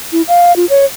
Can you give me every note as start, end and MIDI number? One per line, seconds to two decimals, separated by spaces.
0.12 0.22 64
0.28 0.55 77
0.56 0.65 65
0.70 0.85 73